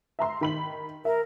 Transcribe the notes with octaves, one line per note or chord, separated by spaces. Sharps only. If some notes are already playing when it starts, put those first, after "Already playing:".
E5 A#5 C6
D#3 B5 F#7
A#4 E5